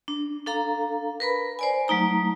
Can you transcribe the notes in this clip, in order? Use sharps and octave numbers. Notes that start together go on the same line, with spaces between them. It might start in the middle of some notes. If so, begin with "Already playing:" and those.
D4
D4 A4 F5 A#5
A#4 B4 B5
C5 D5 G#5
F#3 A3 D#4 A#5